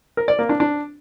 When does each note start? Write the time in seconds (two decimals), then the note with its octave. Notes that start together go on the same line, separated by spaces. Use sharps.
0.17 A#4
0.28 D5
0.39 A#3
0.49 D4
0.60 D4